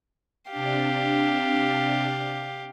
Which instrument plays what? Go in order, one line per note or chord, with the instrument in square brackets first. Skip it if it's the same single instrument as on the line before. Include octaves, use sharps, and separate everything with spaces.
[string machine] C3 D4 [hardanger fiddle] G4 F5